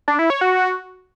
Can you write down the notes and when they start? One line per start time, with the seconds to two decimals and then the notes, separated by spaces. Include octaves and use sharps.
0.08 D4
0.19 E4
0.30 C#5
0.41 F#4